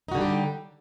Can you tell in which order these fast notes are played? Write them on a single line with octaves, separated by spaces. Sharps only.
D#4 F#4 D3 G3 G4